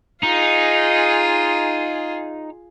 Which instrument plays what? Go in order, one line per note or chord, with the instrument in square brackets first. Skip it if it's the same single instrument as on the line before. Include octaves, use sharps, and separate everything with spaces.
[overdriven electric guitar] D#4 [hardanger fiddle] F4 G#4